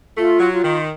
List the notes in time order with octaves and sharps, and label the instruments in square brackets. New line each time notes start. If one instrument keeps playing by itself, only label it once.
[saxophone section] A3 [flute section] F4
[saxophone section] F#3
[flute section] F4
[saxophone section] D#3